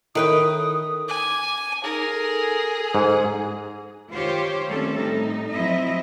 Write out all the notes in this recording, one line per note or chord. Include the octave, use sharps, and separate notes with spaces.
D#3 E4 A4 B4 C#5 G5 D#6
G#5 D6
D#4 G#4 A#4
A4
G#2
D#3 F4 G4 C5 C#5
D#3 G3 A3 C4 C#4 A4
A2 D#4
F3 F#3 C4 E4 D#5 E5